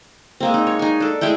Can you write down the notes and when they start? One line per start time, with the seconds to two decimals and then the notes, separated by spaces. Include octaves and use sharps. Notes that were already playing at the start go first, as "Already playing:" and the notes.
0.40 G#3 A#3 C4
0.54 D#4
0.67 C#5
0.79 D#4 G#5
1.00 D4 A4
1.21 G#3 A3 E4 G5